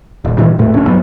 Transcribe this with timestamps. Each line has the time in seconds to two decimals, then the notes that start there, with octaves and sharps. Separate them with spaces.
0.25 D#1
0.38 G2 A#2 D#3 E3
0.58 D#1 G#2 B2 A3
0.74 D1 D2 C#4 D4
0.87 G2 F#3 B3